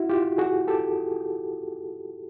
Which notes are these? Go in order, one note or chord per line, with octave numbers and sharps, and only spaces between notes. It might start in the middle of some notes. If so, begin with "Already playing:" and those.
Already playing: E4 F#4
F4 G4
F#4 G#4
G4 A4